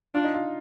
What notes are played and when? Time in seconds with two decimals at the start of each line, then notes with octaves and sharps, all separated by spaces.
0.15 D4 F4
0.24 D#4
0.34 F4